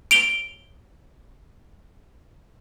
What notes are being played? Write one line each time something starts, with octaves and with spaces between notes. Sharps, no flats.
D7 F7 G7